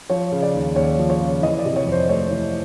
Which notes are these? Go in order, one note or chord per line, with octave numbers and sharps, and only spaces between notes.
F3 C#5
C#3
D5
D#2
D#2 C#5
F3
C#5
C#3
E3 D#5
D5
C3
C#5
F2
C5
A3 C#5
E3